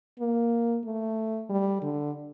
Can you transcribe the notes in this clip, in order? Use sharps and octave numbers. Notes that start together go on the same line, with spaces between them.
A#3
A3
G3
D3